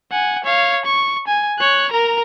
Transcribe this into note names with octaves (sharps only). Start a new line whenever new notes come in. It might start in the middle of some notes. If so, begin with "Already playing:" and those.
F#5 G#5
C#5 F5
C#6
G#5
C#5 F#6
A#4 A#5